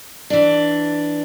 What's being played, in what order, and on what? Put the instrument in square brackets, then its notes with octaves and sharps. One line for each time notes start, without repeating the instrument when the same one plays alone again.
[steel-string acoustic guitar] E3 D4